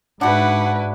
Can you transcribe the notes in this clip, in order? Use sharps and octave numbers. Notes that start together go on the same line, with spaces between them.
G#2 D4 E4 F#4 B4 F#5